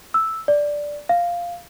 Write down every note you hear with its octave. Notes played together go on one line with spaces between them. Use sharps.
E6
D5
F5